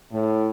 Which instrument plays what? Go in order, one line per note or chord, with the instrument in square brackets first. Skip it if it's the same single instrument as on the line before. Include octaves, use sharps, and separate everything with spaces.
[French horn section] A2